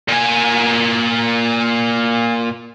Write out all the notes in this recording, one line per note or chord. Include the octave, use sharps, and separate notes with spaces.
A#2 G#5